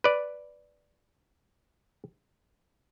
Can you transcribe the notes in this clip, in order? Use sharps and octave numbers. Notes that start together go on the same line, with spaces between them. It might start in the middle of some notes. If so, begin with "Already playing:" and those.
B4 D5